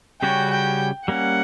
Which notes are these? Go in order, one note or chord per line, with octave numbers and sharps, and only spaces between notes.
C#3 G3 C#4 F#4 C#5 G5
G5
G3 A#3 C#4 F#5